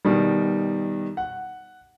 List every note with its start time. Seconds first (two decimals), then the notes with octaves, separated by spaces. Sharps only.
0.05 B2 D#3 G3
1.17 F#5